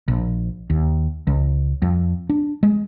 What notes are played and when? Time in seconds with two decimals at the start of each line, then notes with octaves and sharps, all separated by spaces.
0.08 A#1
0.70 D#2
1.27 C#2
1.82 F2
2.29 D4
2.63 G#3